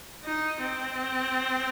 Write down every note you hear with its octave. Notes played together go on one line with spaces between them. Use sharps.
D#4
C4